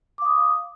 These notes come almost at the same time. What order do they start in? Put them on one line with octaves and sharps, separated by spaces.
D6 F5 D#6